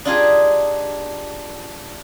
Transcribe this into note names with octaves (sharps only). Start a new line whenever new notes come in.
D4 D#4 F4 G4 G#4